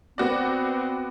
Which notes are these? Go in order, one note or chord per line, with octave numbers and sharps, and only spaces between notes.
B3 C4 F#4 D5